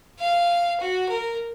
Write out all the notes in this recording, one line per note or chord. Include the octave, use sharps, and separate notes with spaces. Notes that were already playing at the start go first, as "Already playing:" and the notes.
F5
F#4
A#4